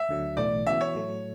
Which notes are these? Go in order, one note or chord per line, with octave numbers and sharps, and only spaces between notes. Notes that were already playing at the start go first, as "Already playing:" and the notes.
Already playing: E5
D2 D3 F#3
B1 A2 E3 A3 D5
C#3 E3 B3 F#4 E5
C#5
A2 F#3 A3